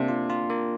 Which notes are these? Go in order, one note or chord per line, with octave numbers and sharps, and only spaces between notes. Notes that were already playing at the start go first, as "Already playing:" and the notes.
Already playing: C3 A#3 D4
F4
F4
A#3